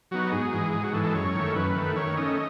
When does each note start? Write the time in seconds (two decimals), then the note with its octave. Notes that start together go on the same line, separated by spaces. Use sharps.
0.11 F#3 B3 D#4 F#4
0.32 G#2 G#4
0.53 E3 G#3
0.73 G#2 G#4
0.83 F#4
0.93 E3 G#3 A4
1.04 A4
1.15 F#2 C#5
1.35 D#3 A3
1.55 F#2 B4
1.76 D#3 A3
1.96 D#3 C#5
2.17 A3 C#4 D#5